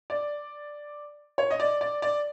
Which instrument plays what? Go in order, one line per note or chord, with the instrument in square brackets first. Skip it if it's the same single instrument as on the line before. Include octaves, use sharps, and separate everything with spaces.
[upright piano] D5
C#5
D#5
D5
D5
D5